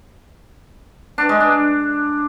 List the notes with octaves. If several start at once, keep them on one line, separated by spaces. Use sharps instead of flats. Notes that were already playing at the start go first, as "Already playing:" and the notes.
D4
G#3
D4